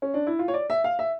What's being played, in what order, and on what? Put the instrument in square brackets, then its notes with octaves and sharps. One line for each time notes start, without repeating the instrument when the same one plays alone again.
[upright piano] C#4
D4
E4
F4
C#5
D5
E5
F5
E5